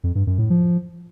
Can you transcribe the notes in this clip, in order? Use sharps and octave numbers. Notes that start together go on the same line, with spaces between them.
F2
G2
F#2
A2
F3